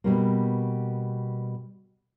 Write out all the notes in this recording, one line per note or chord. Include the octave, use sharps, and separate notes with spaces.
B2 G3 A#3